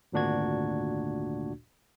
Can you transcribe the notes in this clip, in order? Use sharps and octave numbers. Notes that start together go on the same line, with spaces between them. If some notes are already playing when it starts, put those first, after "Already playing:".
G#1 D2 A#2 D4 F#4 G#6